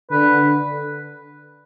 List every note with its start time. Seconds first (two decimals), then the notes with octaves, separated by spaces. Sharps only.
0.11 D3 B4